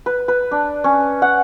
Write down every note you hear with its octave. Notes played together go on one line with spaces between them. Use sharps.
B4
B4
D4
C#4
F#5